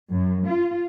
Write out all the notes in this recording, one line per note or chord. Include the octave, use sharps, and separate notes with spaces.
F#2
F4